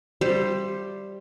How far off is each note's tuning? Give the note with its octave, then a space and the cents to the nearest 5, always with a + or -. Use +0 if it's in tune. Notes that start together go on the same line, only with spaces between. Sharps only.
G3 +0 C5 +0 E5 +35